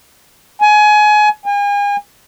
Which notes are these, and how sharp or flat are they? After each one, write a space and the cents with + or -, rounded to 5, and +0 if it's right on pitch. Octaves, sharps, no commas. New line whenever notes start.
G#5 +25
G#5 -40